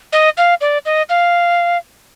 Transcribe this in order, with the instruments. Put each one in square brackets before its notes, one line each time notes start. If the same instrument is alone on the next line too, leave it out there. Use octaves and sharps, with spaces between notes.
[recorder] D#5
F5
D5
D#5
F5